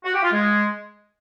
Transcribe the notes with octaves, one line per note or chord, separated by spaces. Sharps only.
F#4
G4
F4
G#3